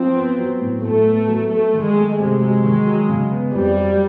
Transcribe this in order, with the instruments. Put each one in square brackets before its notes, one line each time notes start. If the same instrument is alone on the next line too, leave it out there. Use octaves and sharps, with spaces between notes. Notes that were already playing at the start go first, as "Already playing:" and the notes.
Already playing: [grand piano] F3 [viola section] C4
[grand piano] B3
F#3
A2
[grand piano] A2 [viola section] A3
[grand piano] B3
F#3
[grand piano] F#3 [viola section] A3
[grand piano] D#3
[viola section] G#3
[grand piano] A3
[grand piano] C3 [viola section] G#3
[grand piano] F#3
D#3
F#3
C#3
B3
[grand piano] F2 [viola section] G3
[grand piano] F#3